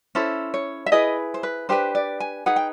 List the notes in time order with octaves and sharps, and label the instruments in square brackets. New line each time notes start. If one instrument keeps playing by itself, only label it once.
[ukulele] C#4 E4 A4 C5
C#5
E5
E4 G#4 B4 D#5
C5
B4
D4 G4 B4 C5
D5
G#5
D#4 G#4 B4 F#5
G5